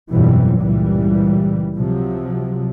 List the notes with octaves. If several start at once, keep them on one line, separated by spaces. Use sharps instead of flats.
G1 F2 B2 E3 F#3 G3
C#2 A#2 E3 G3
C3 F3 F#3